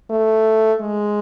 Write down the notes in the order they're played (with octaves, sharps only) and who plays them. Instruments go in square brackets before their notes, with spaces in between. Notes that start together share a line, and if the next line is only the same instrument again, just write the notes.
[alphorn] A3
G#3